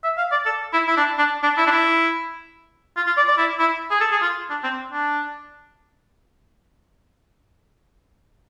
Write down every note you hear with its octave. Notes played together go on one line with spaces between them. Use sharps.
E5
F5
D5
A4
E4
E4
D4
D4
D4
E4
D4
E4
F4
F4
D5
D5
E4
E4
G#4
A4
G#4
F4
D4
C4
D4